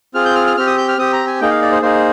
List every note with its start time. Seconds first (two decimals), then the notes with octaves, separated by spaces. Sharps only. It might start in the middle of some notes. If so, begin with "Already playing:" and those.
0.14 C4 F4 G#4 F6
0.25 G6
0.35 F6
0.47 F6
0.57 C4 G4 F6
0.67 D#6
0.78 G6
0.88 F6
0.98 C4 G4 D#6
1.13 A#5
1.27 G#5
1.41 A#3 D#4 G#4 G5
1.51 F5
1.62 D5
1.72 C5
1.82 A#3 D#4 G#4 C5